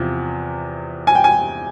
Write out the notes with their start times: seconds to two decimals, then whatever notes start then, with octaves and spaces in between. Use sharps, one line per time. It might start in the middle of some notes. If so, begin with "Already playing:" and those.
Already playing: E2 C3 F3
1.07 G#5
1.15 G5
1.24 G#5